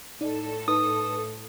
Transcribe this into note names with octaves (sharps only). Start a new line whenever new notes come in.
A2 D#4 A4 D5
D#4 B4 D#6